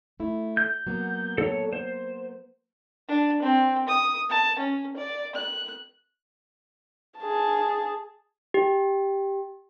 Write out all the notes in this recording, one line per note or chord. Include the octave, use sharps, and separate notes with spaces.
A3 E4
G6
F#3 A#3 B3
A4 C#5
C5
D4
C4
D#6
A5
C#4
D5
F#6
G#4 A5
G4